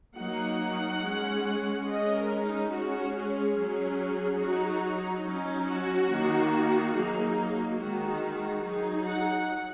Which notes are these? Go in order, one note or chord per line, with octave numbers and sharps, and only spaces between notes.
F#3 A#3 D#4 F#5
G#3 C#4
G#3 C#4 D#5
A#4
D#4
G#3 C#4 F#4
G#4
F#3 C#4
F#3 D#4 F#4
F#4
D#4
F#3 C#4 D#4
F#4
D#3 A#3 D#4
F#3 A#3 D#4 G#4
D#4
D#3 G#3 D#4 F#4
F#4
F#4
F#3 D#4 G#4
F#5